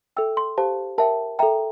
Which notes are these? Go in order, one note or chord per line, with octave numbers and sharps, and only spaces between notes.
A4 E5 G5 E6
C6
G4 C5 F5 A5
A#4 E5 G5 A5
A4 E5 G5 A#5